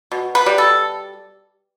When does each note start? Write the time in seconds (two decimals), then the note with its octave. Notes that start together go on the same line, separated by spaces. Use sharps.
0.12 B2
0.35 B4
0.46 G3
0.58 A4